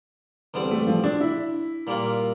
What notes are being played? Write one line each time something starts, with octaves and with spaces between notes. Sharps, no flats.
E2 D3 G3 C4
A3
F3
D4
E4
A#2 G3 A#3 F4 A#4